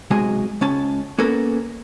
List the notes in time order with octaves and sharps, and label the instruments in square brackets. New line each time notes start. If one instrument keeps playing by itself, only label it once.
[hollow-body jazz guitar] B1 C3 G#3 F#4 D#5 G#5
C#2 C#4 A5
A#3 B3 C#4 A4 A#4